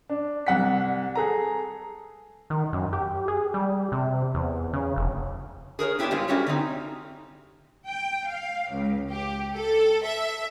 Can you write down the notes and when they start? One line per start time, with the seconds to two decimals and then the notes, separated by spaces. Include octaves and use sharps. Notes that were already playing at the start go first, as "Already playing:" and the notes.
0.10 D4
0.47 C2 F#5 B6
1.15 G#4 A4 A#5
2.50 D#3
2.73 F#2
2.93 G4
3.28 G#4
3.54 G3
3.92 C3
4.34 E2
4.74 C#3
4.96 F1
5.79 G#4 A#4 C5 C#5
5.99 B3 E4 G4 G#4 C5 D5
6.11 G2 G#3 F4
6.28 G3 A3 C#4 F#4 G4 C#5
6.47 D3 C4 D#4
7.87 G5
8.29 F5
8.71 C#2
9.11 G4
9.55 A4
10.05 E5